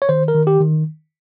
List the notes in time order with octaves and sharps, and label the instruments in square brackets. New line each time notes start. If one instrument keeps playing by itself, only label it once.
[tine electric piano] C#5
D#3 C5
A#4
D#3
G4
D#3